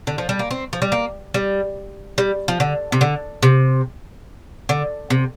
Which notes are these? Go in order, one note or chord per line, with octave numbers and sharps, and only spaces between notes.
D3
F3
G3
A#3
C4
F3
G3
A#3
G3
G3
F3
D3
C3
D3
C3
D3
C3